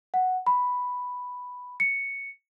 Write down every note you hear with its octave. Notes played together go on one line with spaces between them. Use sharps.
F#5
B5
C#7